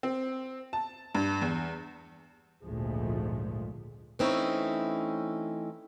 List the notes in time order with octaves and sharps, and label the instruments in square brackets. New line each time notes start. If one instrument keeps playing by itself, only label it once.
[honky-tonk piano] C4
A5
G2
E2
[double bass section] G#1 D2 A#2 F3 G#3 A3
[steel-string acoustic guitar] E3 A3 C4 C#4 D#4 E4